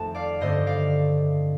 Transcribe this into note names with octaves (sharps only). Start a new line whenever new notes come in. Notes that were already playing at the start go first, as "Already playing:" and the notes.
Already playing: F2 D#3 A3 G5 A5
D5 F5
G2 D3 A3 C4 C5 D#5
D5 F5